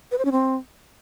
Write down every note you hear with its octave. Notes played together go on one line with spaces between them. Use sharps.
B4
C5
C#4
C4